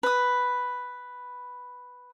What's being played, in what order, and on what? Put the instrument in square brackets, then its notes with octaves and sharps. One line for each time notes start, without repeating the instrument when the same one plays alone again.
[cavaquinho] B4 D#6